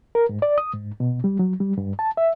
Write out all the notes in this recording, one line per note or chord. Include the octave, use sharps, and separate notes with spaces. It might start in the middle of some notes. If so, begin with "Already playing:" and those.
A#4
G#2
D5
D#6
G#2
B2
G3
F#3
G3
G2
A5
E5